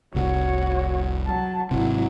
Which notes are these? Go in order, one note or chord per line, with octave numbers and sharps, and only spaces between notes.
F1 C2 F#4 C#5
F#3 A5
G#1 C3 F#3 E4